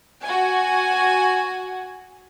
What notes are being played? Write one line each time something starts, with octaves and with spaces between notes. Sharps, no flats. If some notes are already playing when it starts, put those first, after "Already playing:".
F#4 G#5